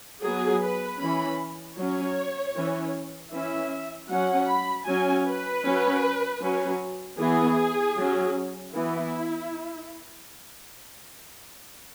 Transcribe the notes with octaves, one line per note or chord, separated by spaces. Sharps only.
F#3 B3 G#4
B4
E3 C#4 B5
F#3 C#4 C#5
E3 C#4
E3 C#4 E5
F#3 C#4 F#5
B5
F#3 C#4 G#5
B4
F#3 C#4
F#3 C#4
E3 B3 G#4
F#3 C#4
E3 B3 E4